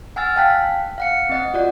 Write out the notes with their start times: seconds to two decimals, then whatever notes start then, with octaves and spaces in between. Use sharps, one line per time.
0.16 F#5 G#5 E6 F6 A6
0.36 F5 G5 A5 F#6 B6
0.98 F5 F#5 C#7
1.29 C4 D#5 F#5
1.54 F4 F#4 D5 F#5